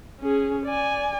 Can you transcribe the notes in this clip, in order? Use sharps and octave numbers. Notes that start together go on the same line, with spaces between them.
C#4 G#4
D5 G#5